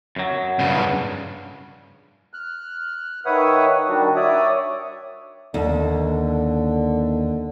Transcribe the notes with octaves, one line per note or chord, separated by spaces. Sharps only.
F#2 F#3
G2 C#3
F6 F#6
D#3 B4 C#5 E5 F#5 D#6
D#3 G3 D4 F#4
C#5 D5 E5 D#6
D#2 D3